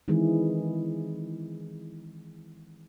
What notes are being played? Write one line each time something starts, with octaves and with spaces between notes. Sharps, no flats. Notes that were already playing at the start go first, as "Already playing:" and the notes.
D#3 E3 G#3 C4 E4 G#4